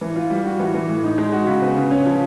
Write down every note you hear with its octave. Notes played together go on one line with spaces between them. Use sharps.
E3
F4
G3
F#4
E3
E3
A2
D#4
G#3
F#4
C#3
B3
C#3
C#4
F3